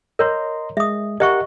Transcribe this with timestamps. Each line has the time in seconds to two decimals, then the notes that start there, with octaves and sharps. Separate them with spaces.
0.19 A#4 C#5 D#5 A#5 C6
0.77 G#3 E5 D#6
1.20 G4 A#4 D#5 E5 F#5 C#6